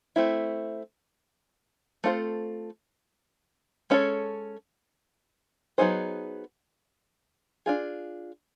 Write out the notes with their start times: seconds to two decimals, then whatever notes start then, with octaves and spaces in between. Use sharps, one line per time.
0.16 A3 C4 E4
2.04 A3 C4 F4 A4 C5
3.90 G#3 C#4 E4 A4 C#5
5.78 F#3 B3 D#4 G#4 C5
7.66 D4 F4 G#4